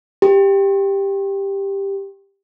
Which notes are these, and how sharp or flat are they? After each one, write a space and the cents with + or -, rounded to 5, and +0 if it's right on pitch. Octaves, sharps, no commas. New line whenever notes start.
G4 +10